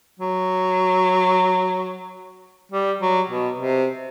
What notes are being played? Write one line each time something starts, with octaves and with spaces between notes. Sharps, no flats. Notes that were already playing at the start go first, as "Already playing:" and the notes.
F#3
G3
F#3
B2
C3